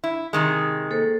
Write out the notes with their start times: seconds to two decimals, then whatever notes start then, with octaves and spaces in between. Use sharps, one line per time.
0.04 E4
0.33 C3 D#3 G#3 D#6
0.90 A#3 A4 C5